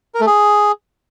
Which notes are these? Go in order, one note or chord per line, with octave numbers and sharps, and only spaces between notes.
A#4
A3
G#4